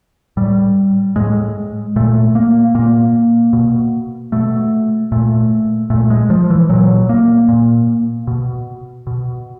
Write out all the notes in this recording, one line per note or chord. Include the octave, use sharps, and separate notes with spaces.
A2 G3
A2 G#3
A#2 A3
A#3
A#2 A#3
B2
B2 A3
A#2 A3
A#2 A3
G#3
F3
E3
A#2 F#3
A#3
A#2
B2
B2